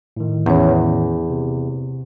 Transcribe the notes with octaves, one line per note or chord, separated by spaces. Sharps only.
A2 D#3
E2 E3 C#4 C#5
C3